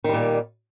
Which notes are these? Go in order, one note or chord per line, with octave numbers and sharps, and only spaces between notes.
A#2 D#3 G3